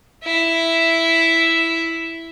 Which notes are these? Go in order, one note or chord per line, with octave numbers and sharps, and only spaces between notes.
E4 E5